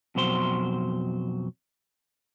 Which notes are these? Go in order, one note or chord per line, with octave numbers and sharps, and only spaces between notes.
F2 B2 F#3 C5 C6